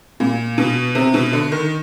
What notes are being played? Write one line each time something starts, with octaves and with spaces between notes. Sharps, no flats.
A#2
B2
C3
B2
D3
D#3